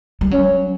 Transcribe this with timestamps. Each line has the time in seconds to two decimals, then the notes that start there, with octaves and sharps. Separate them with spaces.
0.21 G3
0.31 F#3 C#4